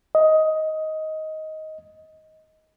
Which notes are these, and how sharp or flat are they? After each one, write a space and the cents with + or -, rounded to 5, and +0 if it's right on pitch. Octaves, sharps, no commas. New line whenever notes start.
D#5 +15